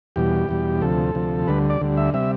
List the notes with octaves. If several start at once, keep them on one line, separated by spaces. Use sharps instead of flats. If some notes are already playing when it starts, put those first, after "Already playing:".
E2 B2 G3 G4
E2 B2 G3
D2 C3 F3 A4
D2 C3 F3
D2 D3 G3 B4
D5
D2 D3 G3
E5
C3 G3 E5